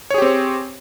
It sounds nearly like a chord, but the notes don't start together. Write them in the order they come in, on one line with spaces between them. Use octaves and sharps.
C#5 G#4 G4 C4